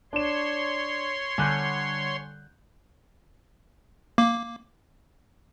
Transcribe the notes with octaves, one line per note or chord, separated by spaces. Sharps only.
D4 C#5 C6 E7
D3 G3 G#5 F#6 G6
A#3 D6